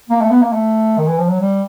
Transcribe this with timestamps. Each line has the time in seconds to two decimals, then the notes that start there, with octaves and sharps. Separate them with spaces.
0.09 A#3
0.21 A3
0.31 B3
0.42 A#3
0.53 A3
0.98 D#3
1.08 E3
1.18 F3
1.29 F#3
1.40 G3